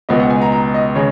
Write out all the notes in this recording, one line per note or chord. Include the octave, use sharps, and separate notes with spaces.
C#2 B2 G#3 B3 D#5
F#5
G#5
A#5
A#5
D#5
C#3 G#3 C#5